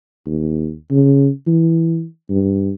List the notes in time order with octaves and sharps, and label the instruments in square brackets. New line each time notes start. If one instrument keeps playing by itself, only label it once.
[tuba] D#2
C#3
E3
G2